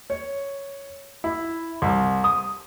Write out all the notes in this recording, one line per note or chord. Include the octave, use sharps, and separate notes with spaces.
C#5
E4
C2
D#6